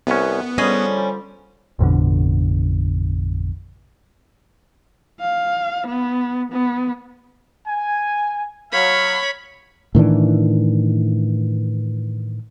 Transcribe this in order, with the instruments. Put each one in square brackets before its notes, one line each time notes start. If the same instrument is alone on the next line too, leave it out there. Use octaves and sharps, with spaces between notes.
[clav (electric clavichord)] C2 C#4 [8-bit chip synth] B3
[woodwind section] D3 F3 G3 [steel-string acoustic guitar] C#4 [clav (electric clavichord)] G#4 D#5
[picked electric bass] A1 F2 B2 D3
[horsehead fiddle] F5
B3
B3
[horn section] G#5
[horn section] F#3 F5 [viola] C#5 B5
[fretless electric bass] A2 D#3 E3 D4